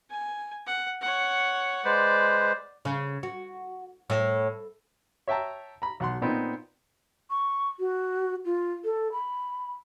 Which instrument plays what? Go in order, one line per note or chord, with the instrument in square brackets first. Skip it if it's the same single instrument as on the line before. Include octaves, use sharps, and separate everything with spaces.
[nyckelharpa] G#5
F#5
C#5 F#5
[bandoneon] G#3 B4 C5 [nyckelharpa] D5
[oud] C#3
F#4
A2
[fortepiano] C#5 E5 G5 A5 A#5
A#5 B5
B1 F#5 C6
A#2 B3 C4 D#4
[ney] C#6
F#4
F4
A4
B5